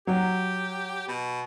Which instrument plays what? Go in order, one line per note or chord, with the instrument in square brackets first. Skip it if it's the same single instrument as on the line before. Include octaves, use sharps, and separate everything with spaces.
[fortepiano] F#3 [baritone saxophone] G4
[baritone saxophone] B2